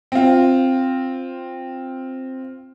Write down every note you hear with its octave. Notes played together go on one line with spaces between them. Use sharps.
C4 F4